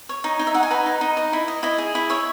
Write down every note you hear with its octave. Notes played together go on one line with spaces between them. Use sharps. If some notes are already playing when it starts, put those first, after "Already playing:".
C#5
D#4
D#4
E5
D#4 F#5
G#5
B4 A#5
D#4
D#4
D#5
E4
D#5
E4 D#5
G#4
E4
C#5 E5